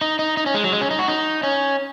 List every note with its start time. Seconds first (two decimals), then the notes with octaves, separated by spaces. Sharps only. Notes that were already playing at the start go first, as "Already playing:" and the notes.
0.01 D#4
0.19 D#4
0.37 D#4
0.46 C#4
0.54 G#3
0.64 F#3
0.72 G#3
0.81 C#4
0.91 D#4
0.99 F#4
1.08 D#4
1.43 C#4